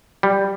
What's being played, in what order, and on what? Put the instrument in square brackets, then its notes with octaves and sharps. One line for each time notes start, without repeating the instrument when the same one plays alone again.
[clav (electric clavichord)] G3